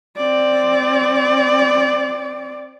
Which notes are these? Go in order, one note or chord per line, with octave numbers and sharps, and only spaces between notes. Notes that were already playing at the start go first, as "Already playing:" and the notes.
C4 D5